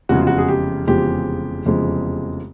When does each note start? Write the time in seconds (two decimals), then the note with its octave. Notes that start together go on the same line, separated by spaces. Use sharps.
0.09 F1 E2 C#3 F3 G#3 F#4
0.18 F4
0.27 F#4
0.38 G#4
0.48 G4
0.87 F1 E2 C#3 F3 G#3 G4
1.66 F1 E2 C#3 F3 G#3